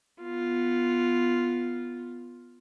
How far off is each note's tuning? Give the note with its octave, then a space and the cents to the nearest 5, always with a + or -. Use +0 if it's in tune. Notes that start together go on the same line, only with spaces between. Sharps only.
B3 +0 F4 +0